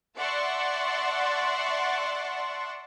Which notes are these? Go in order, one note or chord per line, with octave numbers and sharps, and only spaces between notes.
D5 E5 F#5 A5 C6 C#6